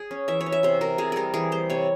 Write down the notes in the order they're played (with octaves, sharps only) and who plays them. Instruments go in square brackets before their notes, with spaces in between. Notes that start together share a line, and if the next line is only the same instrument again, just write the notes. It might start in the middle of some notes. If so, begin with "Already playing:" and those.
Already playing: [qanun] G#4
C#4
E3 E5
C#5
C#4
E5
C3 C5
C3 A#4
C3 G#4
G3 G#4 A#4
E3 G#4
G3 C5
C3 C#5